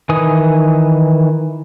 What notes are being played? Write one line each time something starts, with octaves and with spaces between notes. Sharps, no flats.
D#3 E3 B4 G#5 D#6